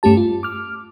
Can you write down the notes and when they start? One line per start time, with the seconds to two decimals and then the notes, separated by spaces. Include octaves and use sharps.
0.03 G2 A3 C#4 G4 A5
0.17 F4
0.43 D6 F6